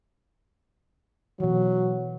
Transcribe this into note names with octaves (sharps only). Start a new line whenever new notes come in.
B2 E3 F#3